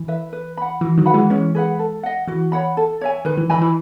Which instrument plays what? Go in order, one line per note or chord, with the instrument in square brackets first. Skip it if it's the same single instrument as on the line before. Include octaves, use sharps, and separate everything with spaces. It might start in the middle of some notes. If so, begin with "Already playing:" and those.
Already playing: [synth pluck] E3
[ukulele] B4 E5
B4
F#5 B5
[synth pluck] E3 [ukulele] F#4
[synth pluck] D#3 F#3
[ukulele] B4 F#5 B5
[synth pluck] E3 G#3
[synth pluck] E3 G#3 [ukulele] C#4
[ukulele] G#4 B4 F#5
A4
D#5 F#5
[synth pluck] E3 [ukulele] F#4
[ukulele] C#5 F#5 B5
A4
C#5 E5 G#5
[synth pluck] D#3 [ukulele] B4
[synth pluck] E3
[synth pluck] E3 [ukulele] D#5 G#5 B5
[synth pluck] E3